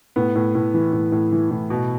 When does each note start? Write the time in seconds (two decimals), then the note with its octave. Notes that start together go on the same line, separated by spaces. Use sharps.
0.16 A2 B3
0.35 A2
0.55 A2
0.74 E3
0.93 A2
1.12 A2
1.32 E3
1.51 A2
1.70 B2